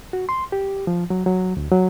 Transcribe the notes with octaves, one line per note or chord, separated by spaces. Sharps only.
F#4
C6
G4
F3
F#3
F#3
D2
F#3